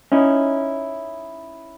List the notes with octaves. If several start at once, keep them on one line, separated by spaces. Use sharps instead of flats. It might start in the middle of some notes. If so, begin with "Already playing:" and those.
C#4 D#4 E4